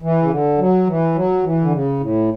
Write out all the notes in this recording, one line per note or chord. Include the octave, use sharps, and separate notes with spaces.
E3
C#3
D3
F#3
E3
F#3
E3
D3
C#3
A2